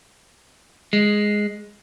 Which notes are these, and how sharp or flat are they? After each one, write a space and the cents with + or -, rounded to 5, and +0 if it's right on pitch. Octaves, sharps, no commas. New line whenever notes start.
G#3 +0